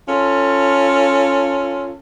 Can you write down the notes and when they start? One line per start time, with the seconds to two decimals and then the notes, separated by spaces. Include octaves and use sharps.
0.07 C#4 F4 A4